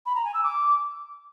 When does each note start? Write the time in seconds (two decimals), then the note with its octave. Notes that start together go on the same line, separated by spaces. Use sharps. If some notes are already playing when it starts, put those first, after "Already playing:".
0.06 B5
0.15 A#5
0.25 G#5
0.34 E6
0.43 D6